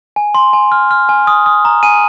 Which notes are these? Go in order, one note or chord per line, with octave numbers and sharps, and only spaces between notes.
G#5
C6
G#5
F6
F6
G#5
D#6
D#6
A#5
G#5 D#7